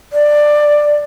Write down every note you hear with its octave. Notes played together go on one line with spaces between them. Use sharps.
D5